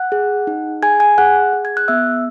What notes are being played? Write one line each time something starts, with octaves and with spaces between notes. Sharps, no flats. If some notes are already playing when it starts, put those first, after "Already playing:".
Already playing: F#5 F#6
G#4
D#4
G#4 G#5 G#6
G#5 G#6
G#4 F#5 F#6
G#4
G#6
F#6
B3 E5 E6